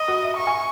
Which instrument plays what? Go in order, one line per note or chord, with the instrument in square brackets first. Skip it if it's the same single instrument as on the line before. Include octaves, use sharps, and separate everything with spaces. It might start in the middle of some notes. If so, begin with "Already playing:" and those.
Already playing: [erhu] D#5
[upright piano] F#4
E5
[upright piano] E5 [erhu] C#6
[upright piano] G#5